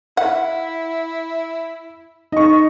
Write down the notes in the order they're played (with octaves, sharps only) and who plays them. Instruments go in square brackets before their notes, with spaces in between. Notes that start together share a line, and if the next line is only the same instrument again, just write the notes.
[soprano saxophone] E4 [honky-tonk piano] E5 [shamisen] F#5
[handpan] D#4 [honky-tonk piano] D#5 C#6